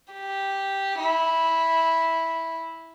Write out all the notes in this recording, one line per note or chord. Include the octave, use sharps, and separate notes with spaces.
G4
E4